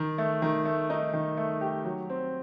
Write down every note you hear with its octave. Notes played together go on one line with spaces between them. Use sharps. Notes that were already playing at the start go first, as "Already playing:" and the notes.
Already playing: D#3
A3
D#3
A3
D#4
D#3
A3
G4
F#3
C4